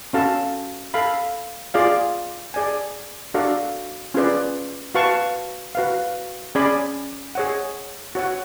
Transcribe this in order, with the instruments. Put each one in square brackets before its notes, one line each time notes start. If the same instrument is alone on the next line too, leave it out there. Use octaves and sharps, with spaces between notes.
[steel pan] C#4 F#4 A4 F5 A5
A4 F5 B5
F4 G#4 D5 F5
G#4 D5 G#5
D4 F#4 A4 D5 F5
C#4 F4 G#4 B4 D5
F#4 B4 F5 A5 C#6
F#4 B4 F5
C#4 G#4 D5 G#5 B5
G#4 C#5 F#5
F#4 C#5 F#5